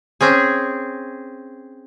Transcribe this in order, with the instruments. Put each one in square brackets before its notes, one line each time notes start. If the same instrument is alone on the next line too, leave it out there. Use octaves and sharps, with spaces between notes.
[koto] C4 C#4 G#4